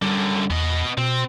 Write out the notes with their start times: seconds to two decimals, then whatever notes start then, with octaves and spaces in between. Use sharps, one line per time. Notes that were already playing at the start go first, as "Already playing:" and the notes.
0.02 F#2 D3 G3
0.50 E2 B3 D#5
0.98 B2 C4